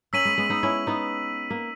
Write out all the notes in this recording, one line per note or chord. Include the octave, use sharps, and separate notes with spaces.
A#3 C#4 E6 B6 D#7 F#7
G#3 B3
G#3 B3
B3 D#4
C#4 E4
B3 D#4
A#3